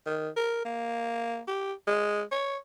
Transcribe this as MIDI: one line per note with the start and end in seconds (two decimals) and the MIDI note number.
0.06 0.29 51
0.36 0.61 70
0.65 1.41 58
1.47 1.73 67
1.87 2.22 56
2.31 2.57 73